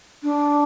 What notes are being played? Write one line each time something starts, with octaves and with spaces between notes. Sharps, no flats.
D4